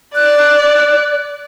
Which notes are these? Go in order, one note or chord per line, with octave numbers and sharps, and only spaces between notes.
D5 F#6